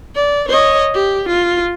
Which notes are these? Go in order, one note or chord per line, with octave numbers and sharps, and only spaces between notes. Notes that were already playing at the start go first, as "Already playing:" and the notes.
D5
C#5 D#5
G4
F4